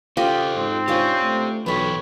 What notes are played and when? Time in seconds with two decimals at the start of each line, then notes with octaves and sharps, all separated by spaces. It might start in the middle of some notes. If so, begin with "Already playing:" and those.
0.17 C#3 F4 G4 A4 C5 D#5
0.57 G#2 C4
0.88 C#4 D4 F4 G4 C5
1.23 A3
1.66 B1 E3 A4 B4 C#5 G5 B5